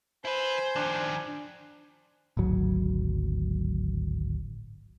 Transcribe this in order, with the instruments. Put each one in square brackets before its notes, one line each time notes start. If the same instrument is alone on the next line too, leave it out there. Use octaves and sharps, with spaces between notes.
[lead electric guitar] E4 B4 [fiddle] C5 [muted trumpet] G#5
[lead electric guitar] D#3 F3 [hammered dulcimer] D4
[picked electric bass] D1 G#1 F#3